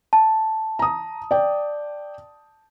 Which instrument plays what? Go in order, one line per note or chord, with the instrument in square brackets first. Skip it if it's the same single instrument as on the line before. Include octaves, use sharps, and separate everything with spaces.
[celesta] A5
[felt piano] A#5 D#6
D5 G5